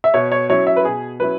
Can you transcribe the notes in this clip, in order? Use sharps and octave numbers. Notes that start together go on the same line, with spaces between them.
E5
B2 C#5
C#5
F#3 C#4 E4 C#5
E5
B4
B2 G#4
F#3 C#4 E4 B4